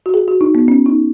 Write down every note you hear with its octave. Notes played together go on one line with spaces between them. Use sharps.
F#4
G#4
F#4
D#4
B3
C#4
D#4